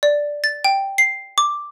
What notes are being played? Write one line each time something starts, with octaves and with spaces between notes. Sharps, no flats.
D5
A6
G5
C7
D6